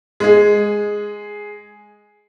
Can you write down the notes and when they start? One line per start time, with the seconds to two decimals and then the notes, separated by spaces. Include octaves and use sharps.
0.20 G#3 G#4